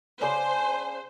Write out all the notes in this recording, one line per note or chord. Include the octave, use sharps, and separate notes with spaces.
C#3 D4 B4 C5 G#5